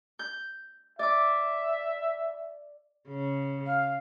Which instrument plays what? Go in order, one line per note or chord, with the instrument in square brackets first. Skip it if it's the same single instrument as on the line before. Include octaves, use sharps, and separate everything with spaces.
[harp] G6
[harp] D5 D6 [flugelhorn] E5
[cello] C#3
[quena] F5